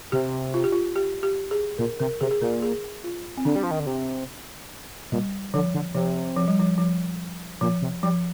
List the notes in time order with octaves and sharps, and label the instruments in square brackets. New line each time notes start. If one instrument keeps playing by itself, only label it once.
[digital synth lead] C3 [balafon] G4
[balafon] F4
G4
F4
G4
G4
G#4
[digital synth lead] A#2 [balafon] A#4
[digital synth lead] C3 [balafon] A#4
[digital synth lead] C3 [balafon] G#4
[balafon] G#4
[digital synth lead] A#2 [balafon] A#4
[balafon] G#4
F4
C4
[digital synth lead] D3 [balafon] D4
[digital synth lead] G3
F3
D#3
D3
C3
[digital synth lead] A#2 [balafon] G3
[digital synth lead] D3 [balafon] F3
[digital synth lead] D3
[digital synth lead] C3 [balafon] F3
[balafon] F3
G3
F3
F3
[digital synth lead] A#2 [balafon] F3
[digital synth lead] C3
[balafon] F3 [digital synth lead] G3